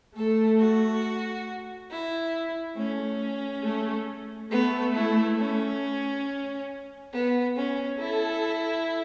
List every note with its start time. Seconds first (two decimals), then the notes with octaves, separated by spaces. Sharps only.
0.16 A3 A4
0.59 F#4
1.90 E4
2.77 A3 C#4
3.64 A3
4.51 A3 B3
4.94 E4
5.39 C#4
7.12 B3
7.56 C#4
7.99 E4 A4